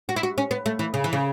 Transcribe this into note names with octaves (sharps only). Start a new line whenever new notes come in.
F#4
E4
F#4
C#4
B3
A3
E3
C#3
E3
C#3